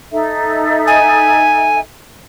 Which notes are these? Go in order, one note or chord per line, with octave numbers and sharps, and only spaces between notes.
D#4 A4 E5
G#5